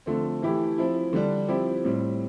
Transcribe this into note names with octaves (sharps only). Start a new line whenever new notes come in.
D3 F3 A3 C4
E3 A3 E4 G4
F3 C4 E4
D3 G3 D4
F3 C4 E4 G4
A2 G3 C4